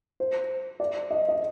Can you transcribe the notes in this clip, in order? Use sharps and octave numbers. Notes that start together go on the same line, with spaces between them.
C5
D5
D#5
D#5